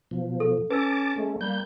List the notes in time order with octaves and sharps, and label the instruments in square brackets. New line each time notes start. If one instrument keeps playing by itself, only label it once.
[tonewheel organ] B2 F3
[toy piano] A4
[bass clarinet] C#4 [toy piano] B4 E6 [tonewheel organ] A5 D6
[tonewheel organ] G#3 A3 [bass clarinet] C#4
[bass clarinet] G3 [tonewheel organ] A#3 G6